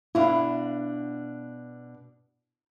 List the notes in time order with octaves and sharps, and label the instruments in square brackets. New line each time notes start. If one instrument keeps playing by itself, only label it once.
[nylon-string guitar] B2 D4 F5 [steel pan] E4